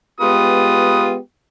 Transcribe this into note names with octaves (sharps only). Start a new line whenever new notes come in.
G#3 B3 F4 G4 B4 D#6